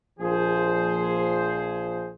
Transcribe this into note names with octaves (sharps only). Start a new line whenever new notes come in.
A#1 F3 G#4 C5